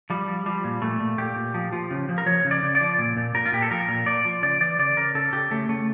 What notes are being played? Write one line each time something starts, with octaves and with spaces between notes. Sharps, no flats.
F3 G3
F3
F3 G3
A#2
A#2 A3
A#2
A#2 G4
A#2
F3
F3
C#3
F3
A#4
F3 C#5
C#3
D5
C#3
D5
F3
A#2
A#2
A#2 A#4
F4
A#2 G4
A4
F3 A#4
A#2
A#2 D5
F3
C#3 D5
E3 D5
C#3 D5
C#3 A#4
C#3 A4
C#3 G4
C#3 A3
C#3 A3